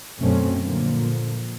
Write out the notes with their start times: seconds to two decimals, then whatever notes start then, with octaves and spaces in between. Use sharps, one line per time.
0.20 F#2 B2 F#3 A3 C4 C#4
0.62 A#2 D3 F3 A#3